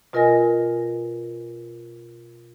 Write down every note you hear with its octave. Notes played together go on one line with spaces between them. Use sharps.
B2 F4 A#4 D#5 G#5 A#6